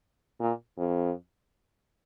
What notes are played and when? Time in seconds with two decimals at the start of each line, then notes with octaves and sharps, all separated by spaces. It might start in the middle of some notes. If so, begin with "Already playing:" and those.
0.40 A#2
0.78 F2